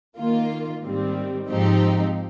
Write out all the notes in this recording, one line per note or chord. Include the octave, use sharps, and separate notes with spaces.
D#3 A#3 F4
G#2 D#3 G3 C4
G#2 F3 C4 D#4 G4